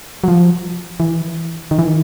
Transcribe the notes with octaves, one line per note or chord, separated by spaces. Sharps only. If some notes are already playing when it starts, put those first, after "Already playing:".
F#3
F3
E3
D#3
E3
D#3